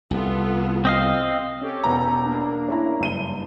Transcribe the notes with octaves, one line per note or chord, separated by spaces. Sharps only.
C2 B3 F4 A4
C4 D#5 F5
C#4 G4 A4
E1 B3 A#5
A#3 D4
C#4 E4 A#5
F#1 G2 D#7 G7